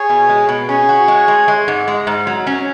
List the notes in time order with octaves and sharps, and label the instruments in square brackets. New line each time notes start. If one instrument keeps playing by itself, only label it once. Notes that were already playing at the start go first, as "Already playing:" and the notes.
Already playing: [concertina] G#4 C#5
[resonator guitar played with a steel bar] B2
G#3
B2
[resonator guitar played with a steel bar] C#4 [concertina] G#4 C#5
[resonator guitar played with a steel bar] F#4
G#3
G#3
G#3
G#2
G#3
G#2
F#3
C#4